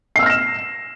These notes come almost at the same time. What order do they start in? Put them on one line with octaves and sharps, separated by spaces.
C7 E6 F6 A#6 E7